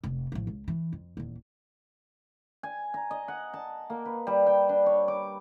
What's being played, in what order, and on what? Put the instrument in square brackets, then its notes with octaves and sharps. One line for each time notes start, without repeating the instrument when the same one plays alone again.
[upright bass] F1
A1 F3
C#2
E3
F2
D#1 E2
[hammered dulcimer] G#5
A#5
D#5
F#5
A5
A#3
B4
G3
G5
D4
C#5
D6